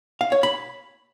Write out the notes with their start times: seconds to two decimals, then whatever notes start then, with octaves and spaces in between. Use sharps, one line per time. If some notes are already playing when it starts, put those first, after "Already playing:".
0.21 F5
0.32 C#5
0.43 B5